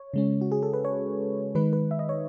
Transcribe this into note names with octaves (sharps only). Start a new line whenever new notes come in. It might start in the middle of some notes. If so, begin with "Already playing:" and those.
Already playing: C#5
C#3 G#3 C#4
F#4
G#4
A4
B4
C#5
D#3 G#3 D#4 B4
B4
E5
D#5
C#5